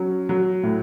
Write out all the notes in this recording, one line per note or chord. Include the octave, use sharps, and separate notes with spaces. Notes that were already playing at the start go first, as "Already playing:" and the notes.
Already playing: F#3 C#4
F#3
A2